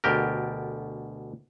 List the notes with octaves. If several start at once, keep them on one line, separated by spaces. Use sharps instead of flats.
D2 B2 G4 A#4